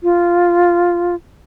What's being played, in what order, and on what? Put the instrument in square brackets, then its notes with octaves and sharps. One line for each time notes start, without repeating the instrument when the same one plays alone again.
[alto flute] F4